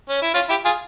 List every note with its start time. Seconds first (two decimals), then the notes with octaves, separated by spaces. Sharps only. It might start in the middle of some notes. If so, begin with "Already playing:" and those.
0.09 C#4
0.22 E4
0.34 C#4 F4
0.49 E4 G4
0.65 F4 G#4